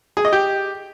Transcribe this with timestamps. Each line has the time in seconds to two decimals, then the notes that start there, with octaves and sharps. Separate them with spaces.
0.17 G#4
0.25 D#5
0.33 G4